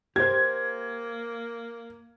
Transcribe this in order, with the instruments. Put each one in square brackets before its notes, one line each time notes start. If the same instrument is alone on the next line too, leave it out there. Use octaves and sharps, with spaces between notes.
[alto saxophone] A#3 [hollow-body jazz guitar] G4 C5 [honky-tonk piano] G#6